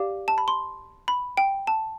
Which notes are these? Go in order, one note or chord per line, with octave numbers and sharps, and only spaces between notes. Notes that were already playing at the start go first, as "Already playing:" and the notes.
Already playing: G4 D5 F5 D6
A5
B5
C6
B5
G5
A5